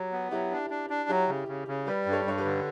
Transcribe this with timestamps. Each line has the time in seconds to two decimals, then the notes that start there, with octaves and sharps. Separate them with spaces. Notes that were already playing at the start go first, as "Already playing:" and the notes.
Already playing: F#3 F#4 G4
0.12 B3
0.31 F#3 E4 G4
0.52 D4
0.70 D4
0.90 D4
1.09 F#3 E4 G4
1.29 C#3
1.48 C#3
1.68 C#3
1.87 G3 G4 B4
2.06 G2
2.12 A4 C#5
2.25 G2 C#5
2.38 G4 B4
2.45 D3